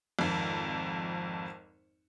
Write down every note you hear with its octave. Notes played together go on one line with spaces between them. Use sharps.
G#1 F2